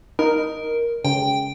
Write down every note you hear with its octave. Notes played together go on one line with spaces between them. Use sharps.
D#4 A#4
C#3 G5